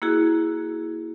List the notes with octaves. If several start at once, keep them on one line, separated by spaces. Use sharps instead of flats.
A#3 E4 F#4 G#4